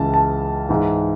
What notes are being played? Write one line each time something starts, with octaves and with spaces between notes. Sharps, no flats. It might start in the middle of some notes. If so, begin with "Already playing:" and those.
Already playing: C#2 C#3 E3 A5
A5
G#2 E3